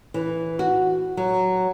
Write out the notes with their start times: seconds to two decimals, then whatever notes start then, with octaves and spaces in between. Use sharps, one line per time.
0.14 E3
0.59 F#4
1.17 F#3